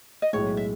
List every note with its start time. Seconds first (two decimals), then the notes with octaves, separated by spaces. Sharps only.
0.22 D#5
0.33 B1 A2 G#3 C#5
0.57 E5